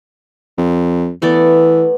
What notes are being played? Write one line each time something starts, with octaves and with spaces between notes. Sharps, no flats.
F2
E3 A3 B3 D5